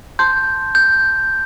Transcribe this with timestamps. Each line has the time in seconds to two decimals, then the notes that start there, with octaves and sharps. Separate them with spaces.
0.19 A5 C6 G6
0.75 G6